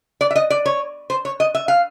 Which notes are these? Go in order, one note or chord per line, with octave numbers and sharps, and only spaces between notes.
D5
E5
D#5
D5
C#5
C5
C#5
D#5
E5
F5